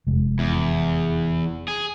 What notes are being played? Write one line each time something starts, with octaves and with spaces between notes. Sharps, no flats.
F1 G#3
E2
G#4